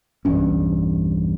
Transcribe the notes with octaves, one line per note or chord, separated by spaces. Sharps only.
B1 E2 G2 C#4